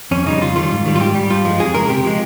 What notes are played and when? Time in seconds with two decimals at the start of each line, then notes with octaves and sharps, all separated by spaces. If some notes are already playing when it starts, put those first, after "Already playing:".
0.11 F2 C#4
0.26 C#3 G3 D#4
0.41 F2 F4
0.56 D#3 G3 F4
0.71 G#2
0.86 D#3 G3
0.96 F4
1.00 G#2 G4
1.15 G3
1.30 G2 F4
1.45 F3 G#3
1.59 F2 G#4
1.74 C#3 G#3 A#4
1.89 C3 G4
2.04 F3 G#3